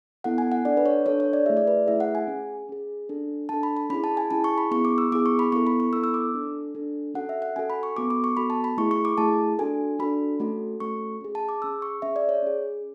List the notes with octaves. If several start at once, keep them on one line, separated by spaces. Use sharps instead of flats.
B3 E4 A4 F#5
G#5
F#5
D4 A4 D5
B4
C#5
D4 A4 C#5
C#5
D5
A3 E4 G#4 E5
D5
B4
A3 E4 G#4 E5
F#5
G#5
C#4 G#4
C#4 G#4
D4 A4
D4 A4 A5
B5
B5
C#4 E4 G#4 B5
A5
G#5
C#4 E4 G#4 A5
C#6
B5
B3 E4 G#4 C#6
D6
E6
B3 E4 G#4 D6
C#6
B5
B3 E4 A4 C#6
B5
C#6
B3 E4 A4 E6
E6
D6
D4 A4
D4 A4
C#4 F#4 A4 F#5
E5
F#5
C#4 F#4 A4 G#5
B5
C#6
B3 F#4 A4 D6
D6
C#6
B3 F#4 A4 B5
A5
B5
A3 E4 G#4 C#6
C#6
D6
A3 E4 G#4 A5
D4 F#4 A4 G#5
D4 F#4 A4 B5
A3 C#4 F#4 A4
A3 C#4 F#4 A4 C#6
C#4 G#4
A5
D6
C#4 G#4 E6
C#6
C#4 G#4 E5
D5
C#5
C#4 G#4